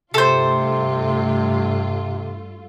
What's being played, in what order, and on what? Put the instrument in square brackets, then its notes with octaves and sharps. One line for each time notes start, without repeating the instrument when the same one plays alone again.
[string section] G2 A3 F4 [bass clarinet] C3 [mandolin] A4 C5